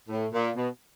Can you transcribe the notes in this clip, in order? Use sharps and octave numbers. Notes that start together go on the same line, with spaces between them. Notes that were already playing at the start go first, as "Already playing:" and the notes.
A2
A#2
B2